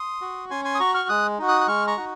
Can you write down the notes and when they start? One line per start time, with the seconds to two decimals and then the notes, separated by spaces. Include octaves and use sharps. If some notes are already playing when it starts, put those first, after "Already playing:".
Already playing: C6 D#6
0.21 F#4
0.51 C#4 G#5 C6
0.65 G#5 C6
0.75 D#6
0.79 F#4 A#5 C#6
0.94 C#6 F6
1.09 G#3 D#6 F#6
1.39 D#4 F#4
1.48 D#6 F#6
1.61 F#6
1.68 G#3 C#6 F6
1.87 A#5 C#6
1.97 D#4 F#4